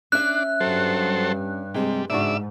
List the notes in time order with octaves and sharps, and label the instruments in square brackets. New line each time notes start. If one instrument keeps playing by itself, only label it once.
[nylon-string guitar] C#4 E5 [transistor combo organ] D4 [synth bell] F#6
[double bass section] G2 [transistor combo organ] F#3 A4 C5
[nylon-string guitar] C3 G#3 C4 [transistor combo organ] G3
[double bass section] G#2 [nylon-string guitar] C#3 D4 F#4 [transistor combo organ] D5 E5 E6